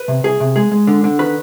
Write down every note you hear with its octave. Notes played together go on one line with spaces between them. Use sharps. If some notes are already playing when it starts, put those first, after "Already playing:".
Already playing: B4
C3
C2 G#4
C3
G#3 G#4
G#3
D3
D3
D#3 B4